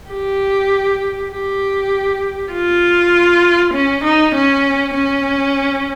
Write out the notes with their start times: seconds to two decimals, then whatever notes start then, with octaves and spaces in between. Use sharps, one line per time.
0.11 G4
1.32 G4
2.53 F4
3.73 C#4
4.04 D#4
4.34 C#4
4.94 C#4